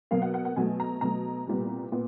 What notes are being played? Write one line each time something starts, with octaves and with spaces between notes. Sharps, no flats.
B2 F#3 A#3 F5
F#5
F#5
F#5
B2 F#3 A3 G#5
A#5
B2 F#3 A3 A#5
C2 A#2 G3 B3
A#2 B3